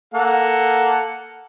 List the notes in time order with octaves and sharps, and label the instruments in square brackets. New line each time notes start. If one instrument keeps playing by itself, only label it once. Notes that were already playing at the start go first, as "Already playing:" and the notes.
[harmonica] A#3 A4 F#5